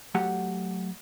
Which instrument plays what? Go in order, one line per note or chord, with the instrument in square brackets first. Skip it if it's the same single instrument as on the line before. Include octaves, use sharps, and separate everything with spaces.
[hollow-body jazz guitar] F#3 A3 G4 F#5